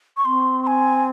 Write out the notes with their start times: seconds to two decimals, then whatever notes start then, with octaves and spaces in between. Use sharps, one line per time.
0.17 C#6
0.24 C4 C6
0.63 C6
0.67 G#5